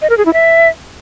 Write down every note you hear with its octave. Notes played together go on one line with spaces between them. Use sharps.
D#5
A#4
G#4
E4
E5